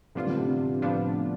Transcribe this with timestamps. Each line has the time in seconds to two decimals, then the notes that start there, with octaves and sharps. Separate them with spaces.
0.15 A2 C3 F3 B3 D4 F4
0.27 D3
0.37 C3
0.82 A2 F3 B3 D4 F4